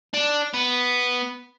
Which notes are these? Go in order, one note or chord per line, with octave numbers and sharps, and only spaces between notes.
D4
B3